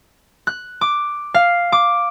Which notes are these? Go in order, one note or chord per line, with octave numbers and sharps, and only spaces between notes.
F#6
D6
F5
D6